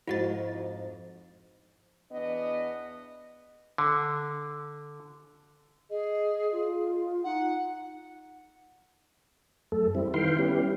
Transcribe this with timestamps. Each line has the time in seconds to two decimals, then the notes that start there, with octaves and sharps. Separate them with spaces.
0.07 F2 G#2 E4 F#4 A6
2.12 E2 B3 D4 D#5
3.78 D3
5.90 G#4 D#5
6.51 F4
7.24 D#4 F#5
9.72 F#2 A3 A4
9.95 G3 C4 E4
10.14 D#3 E4 B4 F5 G5 C6
10.39 G3 B3 C#4 E4 G4